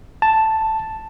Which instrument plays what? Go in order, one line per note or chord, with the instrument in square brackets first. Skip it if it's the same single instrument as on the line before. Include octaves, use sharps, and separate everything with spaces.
[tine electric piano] A5